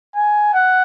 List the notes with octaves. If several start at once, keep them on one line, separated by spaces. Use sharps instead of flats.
G#5
F#5